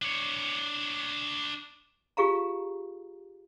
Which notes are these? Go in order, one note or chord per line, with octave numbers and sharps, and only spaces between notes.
D4 C#5
F4 G4 G#4 F5 A#5